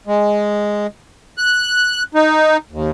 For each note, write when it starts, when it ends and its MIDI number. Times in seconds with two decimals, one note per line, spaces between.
0.07 0.87 56
1.37 2.03 90
2.15 2.57 63
2.71 2.91 39